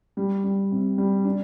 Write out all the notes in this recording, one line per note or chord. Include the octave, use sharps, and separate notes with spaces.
G3
G3
C3
G3
D4